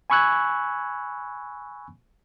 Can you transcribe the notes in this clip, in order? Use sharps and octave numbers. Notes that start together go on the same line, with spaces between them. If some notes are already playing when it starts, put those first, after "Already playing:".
G#5 B5 C#6 E6 F#6 G#6